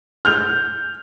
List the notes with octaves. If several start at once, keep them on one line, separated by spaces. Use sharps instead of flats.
F6 G6 F7